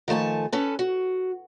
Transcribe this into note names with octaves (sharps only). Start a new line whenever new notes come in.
D#3 F3 A3 G#5 A5
C#4 A4 B4
F#4